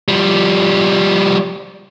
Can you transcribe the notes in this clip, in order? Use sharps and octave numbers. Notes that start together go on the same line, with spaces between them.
F3 G3